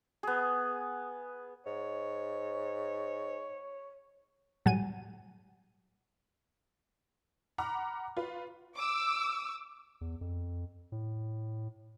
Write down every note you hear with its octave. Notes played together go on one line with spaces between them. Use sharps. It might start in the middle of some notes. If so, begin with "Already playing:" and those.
B3 G#4
G#2 C#5
A2 F#3 G3 F#5 G#5 D#7
F#5 A#5 B5 D6 F6
F4 B4
D6 E6
E2
F2
A2